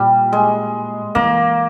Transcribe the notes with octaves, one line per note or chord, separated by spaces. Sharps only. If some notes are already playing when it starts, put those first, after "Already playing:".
Already playing: A#2 G3
G#3
E3 A#3